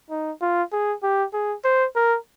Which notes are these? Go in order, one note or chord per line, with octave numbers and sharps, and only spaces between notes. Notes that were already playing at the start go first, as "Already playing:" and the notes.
D#4
F4
G#4
G4
G#4
C5
A#4